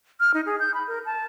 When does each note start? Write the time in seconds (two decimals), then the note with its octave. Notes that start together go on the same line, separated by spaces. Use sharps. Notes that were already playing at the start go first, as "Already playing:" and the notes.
0.20 F6
0.34 D#4
0.46 G#4
0.60 G6
0.74 B5
0.88 A#4
1.06 A5